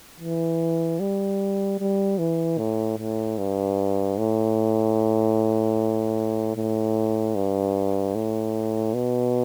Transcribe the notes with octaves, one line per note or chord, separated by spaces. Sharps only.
E3
G3
G3
E3
A2
A2
G2
A2
A2
G2
A2
B2